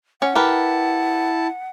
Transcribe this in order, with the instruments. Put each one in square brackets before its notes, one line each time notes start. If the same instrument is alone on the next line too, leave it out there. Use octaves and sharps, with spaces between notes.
[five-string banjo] C#4 [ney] F#5
[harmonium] E4 A5 [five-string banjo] G4 A#4 B4